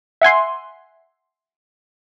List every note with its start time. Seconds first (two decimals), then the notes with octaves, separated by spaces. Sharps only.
0.21 E5 F#5 G#5 C6